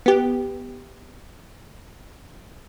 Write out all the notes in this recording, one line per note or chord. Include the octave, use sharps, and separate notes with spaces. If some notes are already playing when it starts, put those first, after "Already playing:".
B3 G4